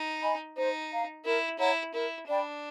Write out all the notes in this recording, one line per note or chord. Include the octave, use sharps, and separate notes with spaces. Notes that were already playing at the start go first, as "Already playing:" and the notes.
Already playing: D#4
D#5 G#5 B5
D#4 C5
F5 A#5
E4 A#4
E4 C#5 F#5 A#5
E4 A#4
D4 D5 G5 B5